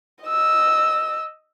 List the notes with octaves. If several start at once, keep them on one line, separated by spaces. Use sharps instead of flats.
D#5 E6